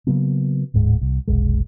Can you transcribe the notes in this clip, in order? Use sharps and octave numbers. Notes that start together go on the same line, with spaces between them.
C#3 F#3 A#3 B3
D1 G#2 G#3
C2
F1 B1 G#3